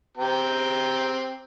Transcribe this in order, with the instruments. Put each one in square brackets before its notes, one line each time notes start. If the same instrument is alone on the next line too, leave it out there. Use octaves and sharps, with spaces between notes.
[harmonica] C4 G4 A#5